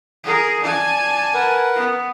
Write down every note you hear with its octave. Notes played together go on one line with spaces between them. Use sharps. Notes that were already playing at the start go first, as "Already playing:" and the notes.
G#4 A#4
D5 G#5 A5
A#4 B4 F#5
B3